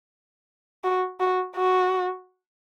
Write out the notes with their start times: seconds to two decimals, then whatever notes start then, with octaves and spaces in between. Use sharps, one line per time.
0.84 F#4
1.20 F#4
1.55 F#4